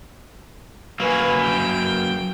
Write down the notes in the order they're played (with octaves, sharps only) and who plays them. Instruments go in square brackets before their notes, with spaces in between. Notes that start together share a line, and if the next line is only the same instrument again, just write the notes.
[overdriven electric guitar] F#3 A#3 [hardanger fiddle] B4 G#5
[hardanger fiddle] G5